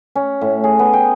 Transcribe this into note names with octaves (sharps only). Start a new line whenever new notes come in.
C#4
A2
G#4
B3
G5